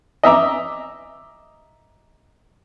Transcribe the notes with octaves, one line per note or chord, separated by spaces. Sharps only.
D#5 E5 A#5 D6